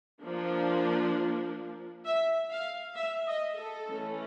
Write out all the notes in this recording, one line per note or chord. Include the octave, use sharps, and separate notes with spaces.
F3 A#3 D4
E5
F5
E5
D#5
A4
E3 A3 C#4